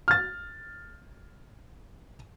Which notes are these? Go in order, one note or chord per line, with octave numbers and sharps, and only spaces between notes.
F6 A6